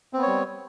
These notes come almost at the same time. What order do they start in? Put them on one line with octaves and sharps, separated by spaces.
C4 B3 C#5 G3